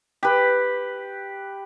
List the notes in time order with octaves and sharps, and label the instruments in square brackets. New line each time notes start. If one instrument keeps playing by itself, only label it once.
[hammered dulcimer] G4 B4